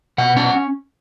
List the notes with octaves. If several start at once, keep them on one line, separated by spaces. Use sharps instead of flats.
B2 F#5
C#4 F#5